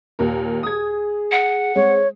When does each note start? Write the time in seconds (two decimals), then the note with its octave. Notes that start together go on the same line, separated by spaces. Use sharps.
0.19 D#2 A#2 A#4
0.63 G#4 D#6 G#6
1.32 F#5
1.76 G#3 C4 C#5